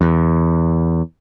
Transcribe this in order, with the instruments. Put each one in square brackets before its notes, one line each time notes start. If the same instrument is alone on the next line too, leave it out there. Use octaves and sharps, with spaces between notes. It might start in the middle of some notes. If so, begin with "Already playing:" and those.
[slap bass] E2